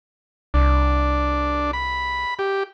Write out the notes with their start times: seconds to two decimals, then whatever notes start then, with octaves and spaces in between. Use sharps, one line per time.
0.54 C2 D4
1.73 B5
2.39 G4